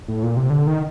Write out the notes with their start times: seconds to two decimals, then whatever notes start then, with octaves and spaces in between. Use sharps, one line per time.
0.08 A2
0.23 A#2
0.37 C3
0.50 D3
0.67 D#3